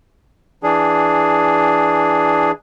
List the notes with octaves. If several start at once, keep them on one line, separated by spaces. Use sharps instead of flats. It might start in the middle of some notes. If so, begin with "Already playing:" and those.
E3 D4 G#4